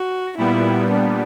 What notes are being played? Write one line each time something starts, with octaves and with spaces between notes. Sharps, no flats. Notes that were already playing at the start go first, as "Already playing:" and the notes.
Already playing: F#4
A#2 G3 B3 E4
D4